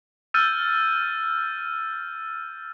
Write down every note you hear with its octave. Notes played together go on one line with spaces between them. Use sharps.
E6 F6 G6 A6 D#7